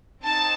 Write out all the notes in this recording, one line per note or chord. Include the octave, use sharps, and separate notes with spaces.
C4 D#4 A5